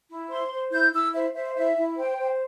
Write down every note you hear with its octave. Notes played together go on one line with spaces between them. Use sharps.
E4
C5 C6
C5
E4 G6
E4 E6
C5 E5
C5 E5
E4 E5
E4
C5 G5
C5